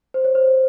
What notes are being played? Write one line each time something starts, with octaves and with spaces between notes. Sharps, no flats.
C5
C#5
C5